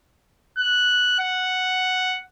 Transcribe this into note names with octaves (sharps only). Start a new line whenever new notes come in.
F#6
F#5